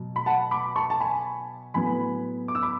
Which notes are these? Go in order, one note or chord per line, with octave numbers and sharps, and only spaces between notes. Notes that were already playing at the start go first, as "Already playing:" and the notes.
Already playing: B2 F#3
B5
F#5 A5
B5 D6
A5 C#6
A5
G#5 B5
A2 F#3 B3 G#5 B5
D6
E6
B5 D6